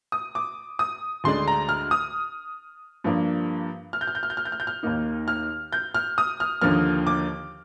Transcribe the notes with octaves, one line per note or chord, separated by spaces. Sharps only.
D#6
D6
D#6
D2 D3 G#3 D4 C6
A#5
F6
D#6
G2 F3 A#3 D4
F6
G6
F6
G6
F6
G6
F6
G6
F6
G6
F6
D#2 D#3 A#3 D#4
F6
G6
F6
D#6
F6
D#2 D3 F3 A#3 F6
D6